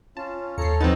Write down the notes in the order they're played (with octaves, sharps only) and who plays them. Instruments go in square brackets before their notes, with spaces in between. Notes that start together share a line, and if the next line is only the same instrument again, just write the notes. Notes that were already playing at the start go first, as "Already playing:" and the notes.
[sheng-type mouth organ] C#4 F4 [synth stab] A5
[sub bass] D#2 [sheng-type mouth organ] A4 C#5 A#5 [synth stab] C7 C#7
[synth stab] F3 B4 A6 [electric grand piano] C4 D#4 [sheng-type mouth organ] F#5 A5 F#6